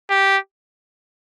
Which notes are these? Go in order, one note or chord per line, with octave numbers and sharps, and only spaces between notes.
G4